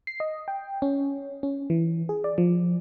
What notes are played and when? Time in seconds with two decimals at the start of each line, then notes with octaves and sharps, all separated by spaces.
0.07 C7
0.20 D#5
0.48 G5
0.82 C#4
1.43 C#4
1.70 E3
2.09 G#4
2.24 D5
2.38 F3